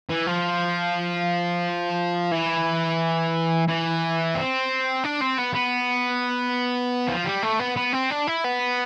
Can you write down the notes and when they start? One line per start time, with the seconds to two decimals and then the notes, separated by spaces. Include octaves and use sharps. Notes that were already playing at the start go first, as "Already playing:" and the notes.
0.09 E3
0.27 F3
2.32 E3
3.68 E3
4.35 C4
5.04 D4
5.21 C4
5.38 B3
5.54 B3
7.08 F3
7.25 G3
7.42 A3
7.59 B3
7.76 B3
7.93 C4
8.10 D4
8.27 E4
8.44 B3